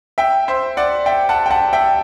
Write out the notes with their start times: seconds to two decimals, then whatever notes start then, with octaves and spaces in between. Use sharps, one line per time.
0.18 E5 G5
0.48 C5 E5
0.77 D5 F#5
1.06 E5 G5
1.29 F#5 A5
1.46 G5
1.51 F#5 A5
1.73 E5 G5